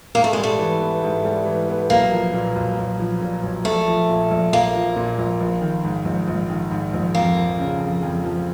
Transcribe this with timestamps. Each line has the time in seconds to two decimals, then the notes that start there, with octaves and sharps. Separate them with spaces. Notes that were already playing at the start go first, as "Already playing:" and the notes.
0.15 G#2 A#3
0.24 A3
0.33 G3 G#3
0.43 A3
0.59 E3
0.80 B3
1.03 G#2
1.25 G3
1.46 E3
1.69 B3
1.90 B1 A#3
2.12 F3
2.33 A#2
2.56 B1
2.78 B1
3.00 F3
3.21 A#2
3.43 B1
3.65 A#1 A3
3.87 F3
4.09 A#2
4.31 A#1
4.53 A#1 A#3
4.74 F3
4.96 A#2
5.18 A#1
5.41 A#1
5.61 D#3
5.84 G#2
6.05 A#1
6.28 A#1
6.50 D#3
6.71 G#2
6.94 A#1
7.15 F2 A#3
7.37 F3
7.59 C#3
7.80 F2
8.03 F2
8.24 F3